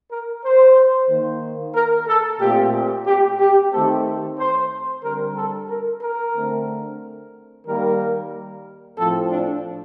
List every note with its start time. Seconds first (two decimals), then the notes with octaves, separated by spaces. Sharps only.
0.11 A#4
0.44 C5
1.10 D#3 A#3
1.75 A#4
2.08 A4
2.40 A#2 A3 C4 G4
3.06 G4
3.40 G4
3.72 D#3 A3 C4 A4
4.38 C5
5.03 D3 G3 C4 A#4
5.36 A4
5.69 A#4
6.02 A#4
6.35 D3 A3 C4
7.66 D#3 G3 A#3 A#4
8.98 A2 F3 C4 A4
9.31 D4